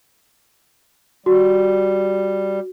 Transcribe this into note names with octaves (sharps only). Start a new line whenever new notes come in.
G3 F#4